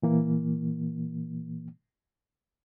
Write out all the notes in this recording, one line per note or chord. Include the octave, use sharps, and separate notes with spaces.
A#2 E3 A#3